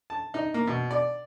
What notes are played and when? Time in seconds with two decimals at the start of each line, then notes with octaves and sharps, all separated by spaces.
0.10 A5
0.34 D#4
0.54 A#3
0.67 B2
0.91 D5